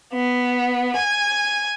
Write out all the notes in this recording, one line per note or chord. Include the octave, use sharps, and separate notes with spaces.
B3
G#5